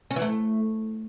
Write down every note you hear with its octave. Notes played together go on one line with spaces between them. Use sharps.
C#4
E3
A3